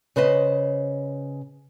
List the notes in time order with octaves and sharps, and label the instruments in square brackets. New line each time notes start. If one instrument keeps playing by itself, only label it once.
[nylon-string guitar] C#3 B4 C5 D#5